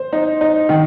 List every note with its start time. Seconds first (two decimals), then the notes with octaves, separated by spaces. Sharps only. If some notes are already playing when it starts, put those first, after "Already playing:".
Already playing: C5
0.13 D#4
0.41 D#4
0.69 D#3